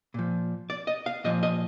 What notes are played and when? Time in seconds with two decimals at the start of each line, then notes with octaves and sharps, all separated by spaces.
0.14 A#2 F3
0.70 D5
0.87 D#5
1.06 F5
1.24 A#2 F3 D#5
1.43 D#5